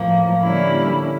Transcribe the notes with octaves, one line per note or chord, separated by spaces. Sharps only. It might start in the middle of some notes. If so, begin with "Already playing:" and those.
Already playing: A2 F3 A#3
D3 G3 A#3 C#4 E4